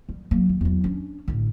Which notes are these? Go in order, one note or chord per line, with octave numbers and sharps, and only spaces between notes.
G3
F#3 A#3
D#2
E2 F#3
C#4 D4
A1 D3